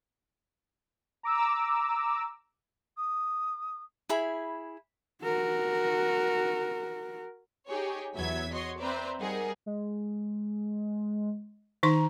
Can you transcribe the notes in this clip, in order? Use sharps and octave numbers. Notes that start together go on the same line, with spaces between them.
A#5 D6 E6
D#6
E4 G#4 B5
F#4 A#4
D#4 G4 G#4 C#5
E2 F#3 B3 E5 G#6 B6
F#4 C#5 D#5 C6
C4 B4 C5 D5 E5 A#5
G3 D#4 G#4 A#4 F#5
G#3
D#3 D#4 A#5 C6